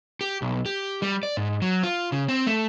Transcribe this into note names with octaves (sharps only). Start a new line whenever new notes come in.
G4
B1
G4
G3
D5
G#2
F#3
F4
C#3
C4
A3